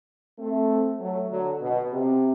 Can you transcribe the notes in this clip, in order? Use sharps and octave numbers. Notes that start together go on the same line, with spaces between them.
A3 C4
F#3 A3
D3 F#3
B2
C3